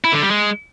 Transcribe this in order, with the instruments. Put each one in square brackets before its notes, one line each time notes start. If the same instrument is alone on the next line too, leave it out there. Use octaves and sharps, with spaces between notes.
[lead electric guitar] E4
D3
G3
G#3